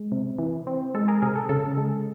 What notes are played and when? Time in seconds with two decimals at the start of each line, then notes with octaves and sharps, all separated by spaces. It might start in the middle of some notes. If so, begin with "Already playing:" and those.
Already playing: G#3
0.12 C3
0.38 E3
0.67 C4
0.94 G#3 A4
1.08 G#4 A#4
1.22 C3 G#4 A#4
1.36 A4
1.49 C#3 A4
1.77 G#3